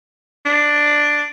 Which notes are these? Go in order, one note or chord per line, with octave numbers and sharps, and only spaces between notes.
D4